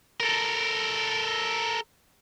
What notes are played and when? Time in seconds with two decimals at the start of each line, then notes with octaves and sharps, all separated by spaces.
0.20 A4 A#4